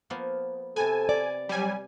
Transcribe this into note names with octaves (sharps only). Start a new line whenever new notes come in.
F3 A#3 B3
C3 B3 A4 G#5
D5
F#3 G3 G#5